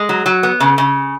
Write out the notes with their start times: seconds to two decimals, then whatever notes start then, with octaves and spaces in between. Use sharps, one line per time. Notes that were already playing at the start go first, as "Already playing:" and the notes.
Already playing: G#3
0.09 F#3
0.26 F#3
0.43 B3
0.60 C#3
0.78 C#3